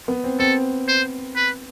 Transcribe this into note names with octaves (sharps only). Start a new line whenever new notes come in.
B3
C4
C4 A4
C5
B4